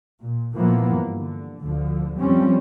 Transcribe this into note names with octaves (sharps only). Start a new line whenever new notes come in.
A#2
A#2 E3 F3 A#3 B3
G2
D3
D2 D3 F3
F2 F3 G3 C4 C#4